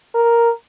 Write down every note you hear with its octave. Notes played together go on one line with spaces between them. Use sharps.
A#4